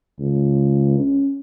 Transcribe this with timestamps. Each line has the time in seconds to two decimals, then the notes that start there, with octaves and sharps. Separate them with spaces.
0.19 C#2
1.00 C#4